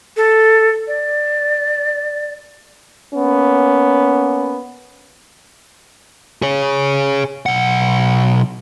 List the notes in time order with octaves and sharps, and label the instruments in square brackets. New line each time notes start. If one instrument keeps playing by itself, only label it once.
[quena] A4
D5
[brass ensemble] A#3 B3 C#4
[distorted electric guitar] G#4 C#5
B1 F#5